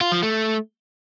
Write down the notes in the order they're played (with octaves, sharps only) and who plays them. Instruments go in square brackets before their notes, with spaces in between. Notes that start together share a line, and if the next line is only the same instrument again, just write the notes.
[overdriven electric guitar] F4
F3
A3